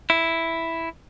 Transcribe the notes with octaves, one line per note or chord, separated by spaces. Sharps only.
E4